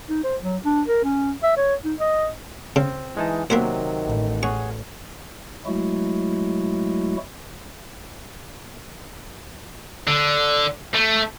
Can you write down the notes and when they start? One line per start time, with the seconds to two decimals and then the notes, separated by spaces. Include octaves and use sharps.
0.09 D#4
0.24 C5
0.42 F#3
0.65 D4
0.88 A#4
1.04 C#4
1.43 E5
1.57 C#5
1.84 D#4
1.99 D#5
2.76 C#3 C4
3.17 E3 G#3 D#4 A5
3.50 C3 D#3 F#3 A#3 B3 C5
4.05 A1
4.43 G#4 C#5 F#5 C#6
5.66 F#3 G#3 A3 E4 F#4
10.07 D3
10.94 A3